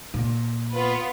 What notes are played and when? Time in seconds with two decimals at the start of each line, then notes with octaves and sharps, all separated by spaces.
0.14 A#2
0.73 B3 F4 B4